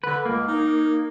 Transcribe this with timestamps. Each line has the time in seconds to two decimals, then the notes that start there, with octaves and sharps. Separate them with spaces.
0.04 D3 B4
0.25 C#2 A#3
0.48 D#4